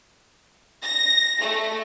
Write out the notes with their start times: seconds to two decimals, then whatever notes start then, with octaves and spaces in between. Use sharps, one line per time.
0.84 A#6
1.41 A3